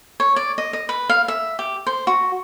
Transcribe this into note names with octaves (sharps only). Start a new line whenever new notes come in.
C#5
D5
D#5
D#5
B4
F5
E5
G4
C5
F#4